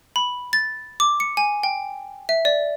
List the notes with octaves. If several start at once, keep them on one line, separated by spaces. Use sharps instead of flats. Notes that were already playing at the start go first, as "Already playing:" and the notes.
B5
A6
D6
C#7
G#5
G5
E5
D5